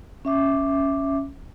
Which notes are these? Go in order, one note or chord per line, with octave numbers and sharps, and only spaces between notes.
C#4 E5 D6